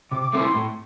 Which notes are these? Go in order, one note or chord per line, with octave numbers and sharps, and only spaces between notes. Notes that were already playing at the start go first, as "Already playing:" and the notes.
C3 D6
D6
A3 C4 E4 D6
C6
A2